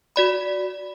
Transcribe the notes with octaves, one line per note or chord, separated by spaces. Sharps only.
F#4 D5 B5